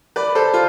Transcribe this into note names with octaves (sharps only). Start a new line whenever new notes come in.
B4 D5
A4 C5
F4